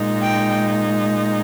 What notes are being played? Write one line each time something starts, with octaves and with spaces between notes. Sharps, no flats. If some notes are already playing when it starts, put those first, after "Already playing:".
Already playing: A#2 G#3 D#4
G5